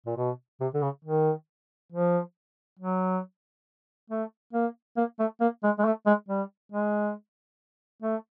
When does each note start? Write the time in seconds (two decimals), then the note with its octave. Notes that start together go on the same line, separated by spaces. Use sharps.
0.06 A#2
0.17 B2
0.61 C3
0.74 D3
0.82 C#3
1.05 D#3
1.92 F3
2.79 F#3
4.10 A3
4.53 A#3
4.97 A#3
5.19 A3
5.41 A#3
5.63 G#3
5.79 G#3
5.85 A3
6.06 G#3
6.29 G3
6.72 G#3
8.02 A3